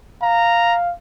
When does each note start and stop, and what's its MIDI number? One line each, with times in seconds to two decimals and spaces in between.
0.22 0.94 77
0.22 0.76 82